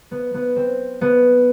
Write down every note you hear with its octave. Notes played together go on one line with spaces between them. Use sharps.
B3
B3
C4
B3